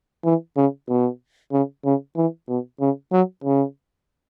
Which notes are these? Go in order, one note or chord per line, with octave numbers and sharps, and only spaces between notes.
E3
C#3
B2
C#3
C#3
E3
B2
C#3
F#3
C#3